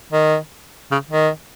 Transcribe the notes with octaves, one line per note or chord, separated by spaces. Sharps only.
D#3
C#3
D#3